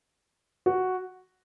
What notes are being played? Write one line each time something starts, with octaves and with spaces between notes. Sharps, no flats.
F#4